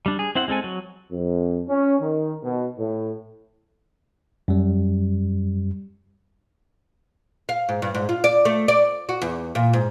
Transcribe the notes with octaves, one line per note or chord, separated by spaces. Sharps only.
G3 D4
G#4
C4 E4 C5 F#5
G#3 C4 A4 G#5
F#3
F2
C#4
D#3
B2
A2
F#2 G3
F5
G#2
G2
G#2
F4
D5
A3
D5
F#4
E2
A#2
G#2